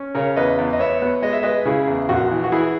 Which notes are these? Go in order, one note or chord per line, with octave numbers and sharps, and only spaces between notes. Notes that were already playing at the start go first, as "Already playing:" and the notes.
Already playing: C#4
C#3 A#4 C#5
E2 B4 D#5
E2
D#5
B3 C#5 E5
B3
G#3 D#5
E5
G#3 B4 D#5
C#3 E4 G#4
E2
A#1 F#4
E3
F#4
E3 E4 G#4